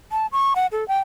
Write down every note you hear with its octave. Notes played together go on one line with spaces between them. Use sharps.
A5
C#6
F#5
A4
G5